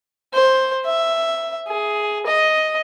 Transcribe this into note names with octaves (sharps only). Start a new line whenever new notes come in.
C5
E5
G#4
D#5